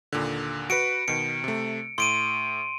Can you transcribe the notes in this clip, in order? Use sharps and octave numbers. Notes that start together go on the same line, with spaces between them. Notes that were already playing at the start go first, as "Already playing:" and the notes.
D#2 A#2 D3
F#4 B4 C#7 D7
B2 D#3 C#7
C3 A3
A2 C6 D7 D#7